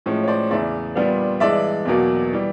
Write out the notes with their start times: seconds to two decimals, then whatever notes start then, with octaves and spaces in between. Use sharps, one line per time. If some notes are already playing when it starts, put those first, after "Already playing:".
0.06 A2 F3 G#3 C#4
0.23 C#5
0.28 C5 D5
0.51 E2 C#3 E3 D5 E5
0.96 A#2 G3 B3 D4 F4
1.40 G2 E3 G#3 D5 E5
1.85 E2 B2 F#3 A#3
2.33 E3 G3